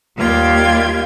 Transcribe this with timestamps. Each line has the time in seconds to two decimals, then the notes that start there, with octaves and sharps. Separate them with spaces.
0.15 D#2 G3 F4 F5 G5 G#6